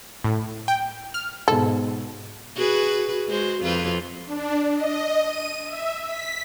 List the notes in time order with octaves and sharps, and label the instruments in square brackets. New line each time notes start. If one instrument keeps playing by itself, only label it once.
[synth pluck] A2
G5
F6
[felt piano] G#2 B2 [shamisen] A4
[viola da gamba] F#4 G#4 B4
G#3 F#4 C5
F2 F4 B4
[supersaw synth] D4
D#5
D#7
E5
B6